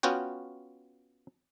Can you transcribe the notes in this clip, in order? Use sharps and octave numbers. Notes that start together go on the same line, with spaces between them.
B3 C#4 F4 F#4 G5